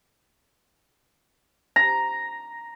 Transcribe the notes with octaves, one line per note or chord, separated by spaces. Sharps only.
A#5